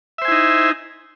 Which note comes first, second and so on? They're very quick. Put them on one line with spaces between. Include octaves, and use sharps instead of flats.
E5 C5 G#5 E4 D#4